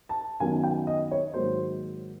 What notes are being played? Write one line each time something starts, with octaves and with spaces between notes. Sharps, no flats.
A5
F#2 D#3 F#3 B3 G#5
G5
D#5
C#5
G#2 D#3 F#3 A#3 C5